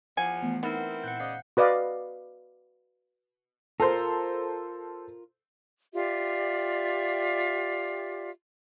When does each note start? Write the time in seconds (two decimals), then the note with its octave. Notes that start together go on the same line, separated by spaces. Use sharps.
0.17 E2 F3 F#5 G#5
0.43 E3 A3 B3
0.63 B3 C4 D#4 E4 A#4 F#5
1.04 A#2 F#5 F#6 G6
1.20 C#3 C5 D5 D#5 F5 F#6
1.57 F#4 B4 D5 D#5 F5
3.80 F4 A4 A#4 C5
5.94 F4 G4 D5 E5